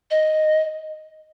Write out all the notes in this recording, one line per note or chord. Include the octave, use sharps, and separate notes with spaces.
D#5